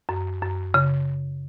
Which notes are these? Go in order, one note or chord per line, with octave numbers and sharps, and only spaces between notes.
F#2
F#2
C#3